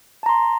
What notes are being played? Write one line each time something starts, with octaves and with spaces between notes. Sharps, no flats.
A5 A#5 C6